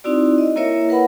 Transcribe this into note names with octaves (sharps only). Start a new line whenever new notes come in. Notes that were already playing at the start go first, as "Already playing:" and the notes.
C4 D#4 E4 F#4 D5
D#5
A#3 E4 A#4 C#5 E5
A#4 B4 F#5 B5